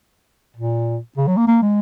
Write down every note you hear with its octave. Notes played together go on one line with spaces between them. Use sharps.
A#2
C#3
F#3
A#3
A#3
G#3